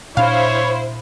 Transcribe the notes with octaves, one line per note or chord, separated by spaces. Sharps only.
A#2 D4 E4 C5 C#5 F5